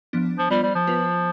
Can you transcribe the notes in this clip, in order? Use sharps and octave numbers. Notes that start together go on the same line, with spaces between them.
F3 B3 D4
F3
G3 B3 F4 C5
G3
F3
B3 F4 B4